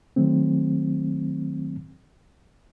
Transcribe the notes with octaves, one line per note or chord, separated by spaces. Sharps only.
D#3 F#3 A3 C4